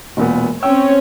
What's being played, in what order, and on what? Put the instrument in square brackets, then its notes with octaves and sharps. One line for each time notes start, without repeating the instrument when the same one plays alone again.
[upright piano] E1 A#2 B3
[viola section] C4 C#4 C#5 [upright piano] G5 E6